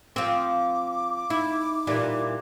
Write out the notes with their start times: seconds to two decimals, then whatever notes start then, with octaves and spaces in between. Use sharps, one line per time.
0.16 F3 C4 D6
1.30 D#4 E4
1.87 A#2 E3 G3